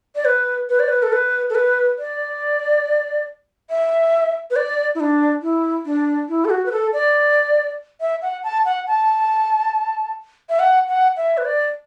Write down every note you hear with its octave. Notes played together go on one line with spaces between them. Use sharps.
D5
B4
B4
D5
B4
A4
B4
A4
B4
D5
E5
B4
D5
E4
D4
E4
D4
E4
A4
F#4
B4
A4
D5
E5
F#5
A5
F#5
A5
E5
F#5
F#5
E5
B4
D5